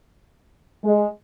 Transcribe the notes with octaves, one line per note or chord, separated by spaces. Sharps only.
G#3